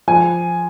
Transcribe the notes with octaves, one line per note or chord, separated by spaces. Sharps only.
F3 G#5